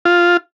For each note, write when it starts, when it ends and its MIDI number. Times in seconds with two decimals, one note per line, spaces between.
0.05 0.37 65